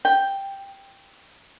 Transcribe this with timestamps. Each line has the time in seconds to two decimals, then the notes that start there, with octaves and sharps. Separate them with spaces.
0.05 G5